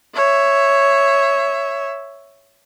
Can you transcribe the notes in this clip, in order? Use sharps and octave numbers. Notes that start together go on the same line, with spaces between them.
C#5 E5